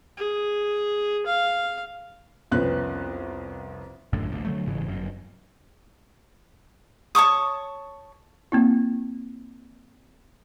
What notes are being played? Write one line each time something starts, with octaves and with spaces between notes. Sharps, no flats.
G#4
F5
C2 F2 B3 C#4 F#6
A1 F#2 A2 D3
A1 D2
D3 F#3 A3
G1 G#2 C#3 E3
G1 F#2
C#5 A5 C#6 D#6
A#3 C4 E4